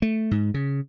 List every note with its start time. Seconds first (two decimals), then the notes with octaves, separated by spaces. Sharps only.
0.02 A3
0.31 G#2
0.54 C#3